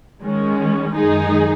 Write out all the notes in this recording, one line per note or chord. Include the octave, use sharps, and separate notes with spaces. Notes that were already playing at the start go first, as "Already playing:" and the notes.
D#3 G#3 C#4
F#2 D#3 G#3 D#4 G#4